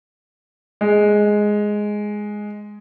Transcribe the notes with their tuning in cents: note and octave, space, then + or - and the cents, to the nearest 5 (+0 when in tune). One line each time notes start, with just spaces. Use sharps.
G#3 +5